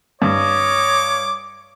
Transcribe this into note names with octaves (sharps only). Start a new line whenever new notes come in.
G2 C#5 D#5 D6